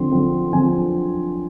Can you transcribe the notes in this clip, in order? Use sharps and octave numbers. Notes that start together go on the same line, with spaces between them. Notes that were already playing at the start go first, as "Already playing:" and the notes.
Already playing: D3 F3 C4 C6
D3 F3 C4
D3 F3 C4 G#5